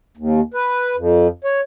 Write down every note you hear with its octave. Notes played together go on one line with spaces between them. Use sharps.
D#2
B4
F2
C#5